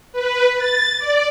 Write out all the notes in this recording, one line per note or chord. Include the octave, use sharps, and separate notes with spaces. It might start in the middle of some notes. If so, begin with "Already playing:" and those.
B4
A6
D5